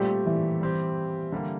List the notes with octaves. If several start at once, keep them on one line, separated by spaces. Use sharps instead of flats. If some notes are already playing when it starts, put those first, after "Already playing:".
Already playing: A#2 G3 A3 C4 G4
E3
G3 C4 G4
D3 G3 A#3